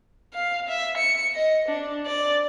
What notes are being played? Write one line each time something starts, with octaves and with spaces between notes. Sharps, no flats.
F5
E5
C#7
D#5
D4
D5